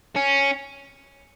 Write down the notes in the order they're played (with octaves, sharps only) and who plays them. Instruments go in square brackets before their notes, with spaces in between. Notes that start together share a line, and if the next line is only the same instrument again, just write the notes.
[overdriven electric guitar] C#4